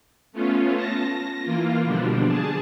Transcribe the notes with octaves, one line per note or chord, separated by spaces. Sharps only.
A3 B3 C#4 F4
A5 A#6
A#6
E3 A#3 F4
B2 D3 F3 G3 D4
G#4 A5